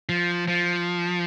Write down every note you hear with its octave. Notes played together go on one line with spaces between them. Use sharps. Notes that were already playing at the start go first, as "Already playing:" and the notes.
F3
F3